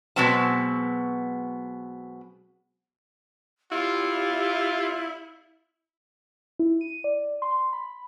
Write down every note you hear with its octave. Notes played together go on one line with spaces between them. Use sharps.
B2 F#3 G#3 B3 C4 A5
E4 F4 G4
E4
D#7
D5
C6
B5